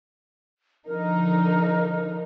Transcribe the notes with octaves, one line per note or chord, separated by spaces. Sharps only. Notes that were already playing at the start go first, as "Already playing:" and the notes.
D3 F3 D#4 A#4